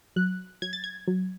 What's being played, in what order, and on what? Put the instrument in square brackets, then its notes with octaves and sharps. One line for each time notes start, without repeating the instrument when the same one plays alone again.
[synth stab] F#3 F#6
F#3 G#6
A6
G#6
F#3